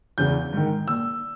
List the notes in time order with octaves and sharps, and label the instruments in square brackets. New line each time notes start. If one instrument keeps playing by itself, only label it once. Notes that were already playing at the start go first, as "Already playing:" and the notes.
[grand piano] E2 C#3 E3 G6
G#2 D#3
A#2 E6